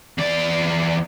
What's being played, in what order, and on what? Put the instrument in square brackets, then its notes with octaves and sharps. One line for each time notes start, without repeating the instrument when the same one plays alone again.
[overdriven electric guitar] E2 D5